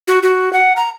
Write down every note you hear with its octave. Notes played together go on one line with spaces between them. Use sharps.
F#4
F#4
F#5
A#5